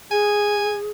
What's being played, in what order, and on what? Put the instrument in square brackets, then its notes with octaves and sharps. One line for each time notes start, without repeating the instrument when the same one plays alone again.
[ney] G#4 [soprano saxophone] G#5